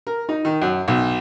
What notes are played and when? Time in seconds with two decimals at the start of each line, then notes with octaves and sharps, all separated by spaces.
0.07 A#4
0.29 D#4
0.45 D#3
0.62 F#2
0.88 B1